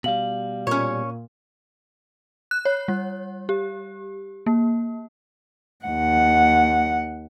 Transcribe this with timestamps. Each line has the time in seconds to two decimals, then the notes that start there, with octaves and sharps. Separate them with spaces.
0.04 B2 G3 F5 F#7
0.67 A#2 C#4 C#5
2.51 F#6
2.65 C#5
2.88 G3
3.49 G4
4.46 A#3
5.86 D#2 F#5